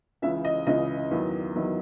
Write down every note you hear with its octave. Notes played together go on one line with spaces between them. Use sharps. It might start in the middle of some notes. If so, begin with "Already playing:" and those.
C#2 C#3 E3 E5
D#5
C#2 C#3 E3 D#5
E2 D#3 F#3
E2 D#3 F#3